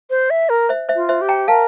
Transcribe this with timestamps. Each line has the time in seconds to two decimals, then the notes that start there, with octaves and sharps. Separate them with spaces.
0.10 C5
0.30 E5
0.49 A#4
0.69 C5 E5
0.89 C5 E5
0.96 F4
1.09 C5 E5
1.21 G4
1.29 G5 A#5
1.48 A#4 F5 A5